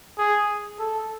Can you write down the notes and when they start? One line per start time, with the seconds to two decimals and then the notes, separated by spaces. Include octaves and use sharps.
0.18 G#4
0.79 A4